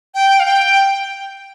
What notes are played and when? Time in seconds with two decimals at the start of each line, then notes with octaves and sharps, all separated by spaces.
0.15 G5
0.40 F5
0.46 G5